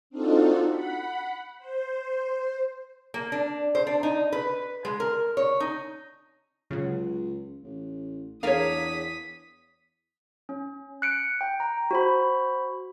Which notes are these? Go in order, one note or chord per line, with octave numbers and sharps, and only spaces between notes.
C4 D4 D#4 F4 F#4 A4
F#5 B5
C5
A#3
D4
C5
D4
D#4
B4
G#3
A#4
C#5
D#4
C#2 C#3 F#3
A1
E2 D4 G#4 A#4 C#5 F5 D#6 B6
C#4
F#6 C#7 D7
G5
A#5
F#4 C5 B5